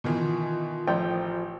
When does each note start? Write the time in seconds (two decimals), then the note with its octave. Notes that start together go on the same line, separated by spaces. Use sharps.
0.04 B2 D#3 E3 F4 C6
0.87 A1 F3 G5